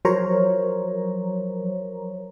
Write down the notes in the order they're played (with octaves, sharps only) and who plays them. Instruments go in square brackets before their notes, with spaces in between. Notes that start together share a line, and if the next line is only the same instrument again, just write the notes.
[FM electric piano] F3 F#3 A#4 C5 C#5 A#5